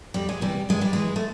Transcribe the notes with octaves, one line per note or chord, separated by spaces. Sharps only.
F2 G3
G#3
C3 E3 G3
G2 G#3
G3
E3 G#3
A3